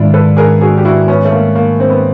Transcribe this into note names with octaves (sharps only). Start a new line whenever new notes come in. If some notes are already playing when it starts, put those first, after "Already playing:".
Already playing: G#2 D#3 G#3 D4 E4 F4
A4 B4
G#4 A#4
F#4 G#4
G4
E4 F#4
B3 C#4
A3
A#3
A#3
C4
B3